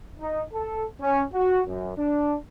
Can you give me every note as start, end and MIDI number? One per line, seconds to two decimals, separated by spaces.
0.20 0.43 63
0.53 0.84 69
1.01 1.23 61
1.32 1.61 66
1.67 1.93 42
1.97 2.35 62